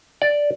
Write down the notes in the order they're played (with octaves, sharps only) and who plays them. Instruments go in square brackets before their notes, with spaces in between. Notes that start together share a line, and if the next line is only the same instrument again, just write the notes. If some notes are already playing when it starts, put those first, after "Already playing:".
[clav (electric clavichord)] D5